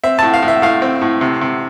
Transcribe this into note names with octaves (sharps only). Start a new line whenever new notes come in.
C4 E5
A2 A5
F5
A2
E5
A2 F5
C4
A2
C3
C3